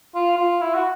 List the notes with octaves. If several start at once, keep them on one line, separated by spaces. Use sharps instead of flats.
F4
F4
E4
F#4